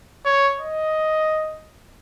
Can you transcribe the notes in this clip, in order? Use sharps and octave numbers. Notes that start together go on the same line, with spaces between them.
C#5
D#5